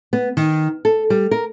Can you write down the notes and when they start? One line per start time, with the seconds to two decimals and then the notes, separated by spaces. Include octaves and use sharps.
0.13 B3
0.37 D#3
0.85 A4
1.10 G3
1.31 A#4